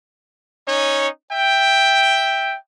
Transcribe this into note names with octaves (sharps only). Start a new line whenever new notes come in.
C#4 D#4 C#5
E5 G5